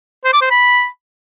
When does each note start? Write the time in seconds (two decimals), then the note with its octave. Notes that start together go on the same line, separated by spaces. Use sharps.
0.24 C5
0.33 D6
0.42 C5
0.50 B5